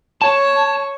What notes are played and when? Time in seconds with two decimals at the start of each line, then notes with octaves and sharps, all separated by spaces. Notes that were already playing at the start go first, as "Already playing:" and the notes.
0.22 C#5 A5